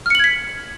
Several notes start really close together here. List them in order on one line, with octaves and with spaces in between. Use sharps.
F6 C#7 F#7 G#6 B6